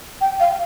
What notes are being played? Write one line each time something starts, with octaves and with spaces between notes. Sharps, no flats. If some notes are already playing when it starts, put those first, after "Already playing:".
G5
F5